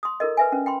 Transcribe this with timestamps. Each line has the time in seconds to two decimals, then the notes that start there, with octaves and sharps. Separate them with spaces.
0.03 C6 D#6
0.20 E4 A4 A#4 D#5
0.37 B4 E5 G#5
0.52 C#4 B4
0.66 G5 B5 C6